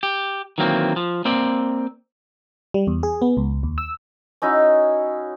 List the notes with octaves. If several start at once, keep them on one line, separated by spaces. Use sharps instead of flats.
G4
D#3 E3 F#3 A#3 C4
F3
A#3 C4 D5
G3
E2
G#4
B3
C#2
D#2
E6
C#4 D#4 E4 F#4